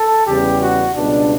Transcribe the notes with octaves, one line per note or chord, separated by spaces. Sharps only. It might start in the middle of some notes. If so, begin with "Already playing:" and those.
Already playing: A4
E2 C#3 G3 G4
F#4
C#2 B2 G3 D4